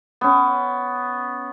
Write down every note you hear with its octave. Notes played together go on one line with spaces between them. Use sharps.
B3 C#4